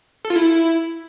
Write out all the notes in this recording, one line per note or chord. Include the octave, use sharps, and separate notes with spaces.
A4
F4
E4